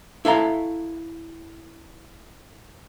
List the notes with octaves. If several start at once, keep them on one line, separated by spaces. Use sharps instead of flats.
E4 A4 F5 A#5